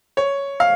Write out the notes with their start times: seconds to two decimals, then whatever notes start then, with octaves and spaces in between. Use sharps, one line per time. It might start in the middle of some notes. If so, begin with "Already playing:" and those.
0.17 C#5
0.60 F5